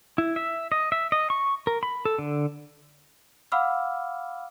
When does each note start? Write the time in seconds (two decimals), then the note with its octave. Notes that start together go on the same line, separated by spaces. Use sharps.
0.18 E4
0.36 E5
0.72 D#5
0.92 E5
1.12 D#5
1.30 C#6
1.67 A#4
1.83 B5
2.05 A4
2.19 D3
3.52 F5 F#5 B5 D6 E6 F6